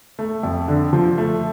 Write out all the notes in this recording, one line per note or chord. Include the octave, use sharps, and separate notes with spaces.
A3
F2
D3
F3
A3